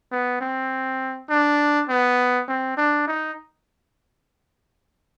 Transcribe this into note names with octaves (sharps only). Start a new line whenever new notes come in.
B3
C4
D4
B3
C4
D4
D#4